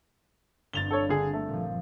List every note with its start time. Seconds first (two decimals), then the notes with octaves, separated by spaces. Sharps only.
0.73 G1 G2 C4 A6 F7 G7
0.91 A4 C#5
1.09 D3 G#4
1.34 A3
1.49 A#2 F3